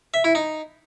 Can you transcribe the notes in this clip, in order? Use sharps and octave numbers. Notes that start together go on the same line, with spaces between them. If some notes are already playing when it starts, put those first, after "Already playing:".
E5
E4
D#4